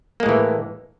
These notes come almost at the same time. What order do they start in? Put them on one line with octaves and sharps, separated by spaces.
A#3 G#3 A2 E3